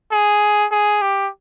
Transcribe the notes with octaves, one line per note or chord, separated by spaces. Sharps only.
G#4
G#4
G4